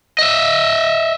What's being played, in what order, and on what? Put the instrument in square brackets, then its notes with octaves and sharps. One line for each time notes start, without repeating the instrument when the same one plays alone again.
[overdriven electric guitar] D#5 E5